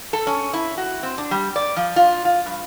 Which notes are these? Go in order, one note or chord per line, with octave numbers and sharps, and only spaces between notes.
A4
C#4
E4
F#4
C4
D4
G3
D5
F3
F4
F4
G2